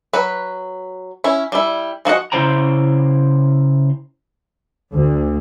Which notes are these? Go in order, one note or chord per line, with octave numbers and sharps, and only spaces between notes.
F#3 B4
C#4 E4
G3 E4
F3 F#4 D#5 F#5
C#3 C4 E4 C5 G5 A#5
D2